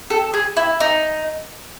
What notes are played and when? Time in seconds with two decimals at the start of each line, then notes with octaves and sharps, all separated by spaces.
0.10 A4
0.34 G#4
0.57 E4
0.80 D#4